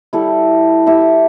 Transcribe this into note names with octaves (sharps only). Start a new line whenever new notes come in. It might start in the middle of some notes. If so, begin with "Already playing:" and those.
G3 E4 A4
E4 G4 E5